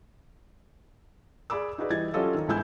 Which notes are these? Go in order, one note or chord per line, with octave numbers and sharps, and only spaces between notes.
G#4 D5 B5 D6 E6
D#4 F#4 G#4 B4 D5 D#5
E3 G3 D#5 G#6 A6
F#3 C#4 F4 G4 A4 D#5
D#3
G1 G#2 E4 G#5 E6 G6